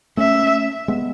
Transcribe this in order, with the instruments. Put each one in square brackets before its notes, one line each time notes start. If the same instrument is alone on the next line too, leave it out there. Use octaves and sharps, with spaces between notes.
[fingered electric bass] A3 C#4 [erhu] E5
[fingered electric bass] G#3 B3